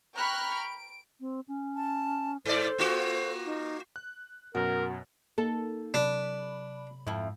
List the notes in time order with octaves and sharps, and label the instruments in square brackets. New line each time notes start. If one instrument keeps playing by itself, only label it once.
[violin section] G5 A#5 B5 C#6 F6 F#6
D7
[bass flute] C4
C#4
[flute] A5
[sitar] G#2 D5 [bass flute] A4 [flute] C5
[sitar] A#3 F4 F#4
[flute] D#4
[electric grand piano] F#6
[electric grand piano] F#2 B2 [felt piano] F#4 [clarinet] A#4
[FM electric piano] A#3 D#4 [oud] A4
[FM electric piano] C3 F#3 B5 [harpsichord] D4
[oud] F2 E4 [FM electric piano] G#2